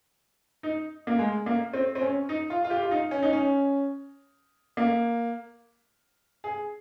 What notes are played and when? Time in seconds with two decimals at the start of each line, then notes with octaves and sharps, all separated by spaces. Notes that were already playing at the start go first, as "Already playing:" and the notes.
0.63 D#4
1.07 A#3
1.19 G#3
1.46 A#3
1.73 C4
1.95 C4
2.02 C#4
2.29 D#4
2.50 F4
2.64 F4
2.70 G4
2.83 F4
2.91 D#4
3.11 C#4
3.22 D#4
3.33 C#4
4.77 A#3
6.44 G#4